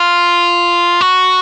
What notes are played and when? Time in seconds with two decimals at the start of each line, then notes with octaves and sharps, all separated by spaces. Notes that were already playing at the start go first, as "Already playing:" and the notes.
Already playing: F4
1.01 F#4